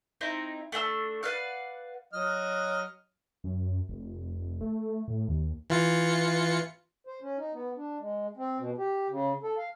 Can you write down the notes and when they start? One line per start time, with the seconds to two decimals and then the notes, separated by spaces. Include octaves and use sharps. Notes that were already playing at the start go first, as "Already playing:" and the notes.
0.21 C4 D#4 E4 A#5
0.72 A3 D4 A#5 E6
1.23 B4 D5 F5 F#5
2.13 F#3 D#5 F6
3.44 F#2
3.89 F1
4.61 A3
5.08 A2
5.28 D#2
5.70 E3 F4 C#7
7.07 C5
7.22 C#4
7.38 D#4
7.54 B3
7.77 D4
8.00 G#3
8.37 C4
8.59 B2
8.78 G4
9.10 C#3
9.43 A4
9.58 F5